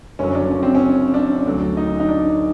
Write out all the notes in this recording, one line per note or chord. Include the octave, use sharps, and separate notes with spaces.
F#1 F#2 D3 F#3 C#4
D4
C#4
C4
C#4
D4
D2 D3 F#3
D#4
D#4
D4